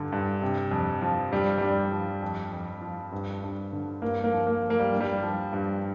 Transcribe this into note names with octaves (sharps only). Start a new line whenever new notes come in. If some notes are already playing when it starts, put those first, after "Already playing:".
Already playing: G2 D3
G2
C3
F2
F3
G2 G3
G2 G3
F3
F2
F2
F3
G2
G2
D3
G2 A#3
A#3
F3
A#3
F3
A#3
G3
G2
G3
F3
G2